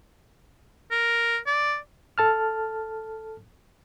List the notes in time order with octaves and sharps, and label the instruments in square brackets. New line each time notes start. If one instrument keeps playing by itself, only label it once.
[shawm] A#4
D5
[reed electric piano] A4 A5 F6